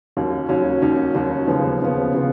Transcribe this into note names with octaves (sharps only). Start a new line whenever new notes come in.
D#2 D#3 F#3 C#4
D#2 D#3 F#3 C#4
D#2 D#3 F#3 C#4
D#2 D#3 F#3 C#4
D#2 C#3 F3 B3
D#2 C#3 F3 B3
C#3 F3 B3